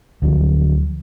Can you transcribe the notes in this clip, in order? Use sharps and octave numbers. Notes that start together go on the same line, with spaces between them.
D2 F3 F#3